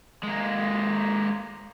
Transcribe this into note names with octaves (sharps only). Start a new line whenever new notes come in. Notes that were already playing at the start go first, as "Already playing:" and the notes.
G#3 A#3